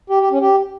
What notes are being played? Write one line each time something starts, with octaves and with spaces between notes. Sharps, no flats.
G4
G4
C#4
G4